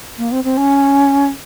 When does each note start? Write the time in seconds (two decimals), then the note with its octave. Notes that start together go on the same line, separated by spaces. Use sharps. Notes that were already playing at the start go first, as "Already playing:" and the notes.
0.18 A#3
0.32 C4
0.44 C4
0.57 C#4